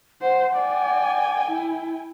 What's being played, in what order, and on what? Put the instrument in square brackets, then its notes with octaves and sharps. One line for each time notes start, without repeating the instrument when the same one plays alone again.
[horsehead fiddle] C5 [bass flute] F#5
[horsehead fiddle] D5 [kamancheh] G5 G#5
[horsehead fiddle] E4